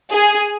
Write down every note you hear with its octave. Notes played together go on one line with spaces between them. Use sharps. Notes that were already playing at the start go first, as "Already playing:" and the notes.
G#4